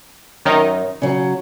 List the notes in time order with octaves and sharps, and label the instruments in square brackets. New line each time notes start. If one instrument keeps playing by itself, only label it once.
[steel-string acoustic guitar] F#2 [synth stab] D#3 D#4
[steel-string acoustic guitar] C#3 F#3